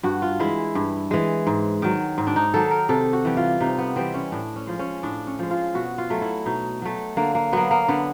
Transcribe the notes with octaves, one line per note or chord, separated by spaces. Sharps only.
G2 F#4
F4
E3 G#3 E4
G2
E3 G#3
G#2
D#3 F#3
G#2
D4
D#4
D#3 F#3 A4
A#4
C3 A4
F#4
E3 G3
F4
C3 D#4
B3
E3 G3 C4
C#4
A2 D4
C#4
F3 G#3
C#4
A2 D4
C#4
F3 G#3
F4
B2 F#4
F4
F#3 A3
E4
B2 D#4
F#3 A3
D3 A#3
A#3
F#3 A#3 B3
A#3
D3 B3